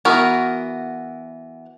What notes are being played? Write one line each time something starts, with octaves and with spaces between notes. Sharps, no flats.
E3 B3 F#4 A#4